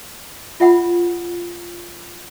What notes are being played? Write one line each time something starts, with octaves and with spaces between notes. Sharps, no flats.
F4 E5 F#5 B5